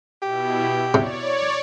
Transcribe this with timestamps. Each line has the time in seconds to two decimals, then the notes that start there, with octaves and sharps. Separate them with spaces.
0.22 B2 E4 G4
0.94 C3 C#5 D5